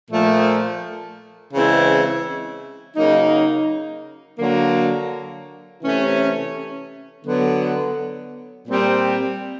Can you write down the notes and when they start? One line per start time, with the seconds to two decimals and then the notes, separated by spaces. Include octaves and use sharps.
0.11 A#2 F3 A3
1.53 C#3 E3 G#3 C4 E4
2.96 C#3 F#3 A#3 D#4
4.39 D3 F#3 A#3
5.82 C3 E3 A3 C#4
7.25 D3 F#3 B3
8.67 A#2 G3 C4